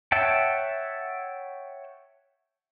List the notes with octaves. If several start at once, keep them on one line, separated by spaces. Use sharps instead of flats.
C#5 E5 F#5 G5 A5